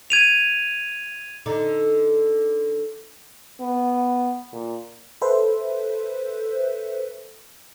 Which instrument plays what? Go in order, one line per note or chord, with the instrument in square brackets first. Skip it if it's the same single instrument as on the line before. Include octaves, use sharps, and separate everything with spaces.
[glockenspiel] G#6 D#7 F7
[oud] D3 D#4
[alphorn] B3
A#2
[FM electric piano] A4 B4 C5 E5